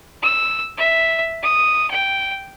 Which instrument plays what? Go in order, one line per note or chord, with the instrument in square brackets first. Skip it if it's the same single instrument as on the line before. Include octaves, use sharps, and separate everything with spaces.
[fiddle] E6
E5
D#6
G5